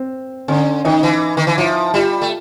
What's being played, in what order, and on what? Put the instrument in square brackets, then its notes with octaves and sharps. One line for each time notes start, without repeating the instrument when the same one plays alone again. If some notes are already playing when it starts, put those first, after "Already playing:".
Already playing: [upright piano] C4
[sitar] D3 [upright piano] C#4
[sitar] D#3 [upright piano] D#4
[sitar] E3
D#3
E3
[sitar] F3 [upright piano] E4
[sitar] G3 [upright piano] F4
[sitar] A3